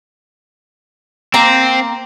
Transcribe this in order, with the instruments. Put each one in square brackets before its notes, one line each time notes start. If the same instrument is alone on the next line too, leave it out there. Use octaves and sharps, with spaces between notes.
[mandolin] A#3 A#5 [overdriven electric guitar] C4